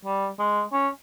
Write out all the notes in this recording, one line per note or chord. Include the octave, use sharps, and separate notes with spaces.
G3
G#3
C#4